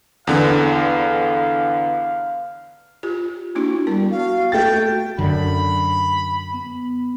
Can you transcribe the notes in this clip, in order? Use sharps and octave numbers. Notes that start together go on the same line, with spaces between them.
E2 D3 B3 F5
F4 G4
A#3 D4 E4 F#4
G3 B3 A#4
F#4 F5
A3 G5 A6
F#2 D3 B5
B3